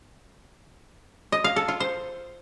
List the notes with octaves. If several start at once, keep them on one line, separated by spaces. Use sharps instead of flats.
D#5
F5
A4
F4
C5